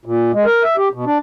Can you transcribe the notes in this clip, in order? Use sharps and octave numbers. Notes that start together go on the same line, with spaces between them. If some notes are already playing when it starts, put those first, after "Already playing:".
A#2
G#3
A#4
E5
G4
B2
D4